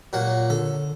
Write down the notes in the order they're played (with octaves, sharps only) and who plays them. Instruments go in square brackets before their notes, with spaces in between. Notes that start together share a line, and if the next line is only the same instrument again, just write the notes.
[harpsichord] A#2 F#3 F#5
[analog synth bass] D3 [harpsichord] A4